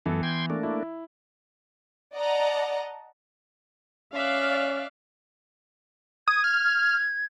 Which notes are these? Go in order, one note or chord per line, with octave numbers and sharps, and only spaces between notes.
F#2 E3 B3 A4
G5 C6 G#6
A3 A#3 D4
E4
D5 D#5 F#5 A5 A#5
C#4 D5 E5 F5 F#6
D#6 G#6
F6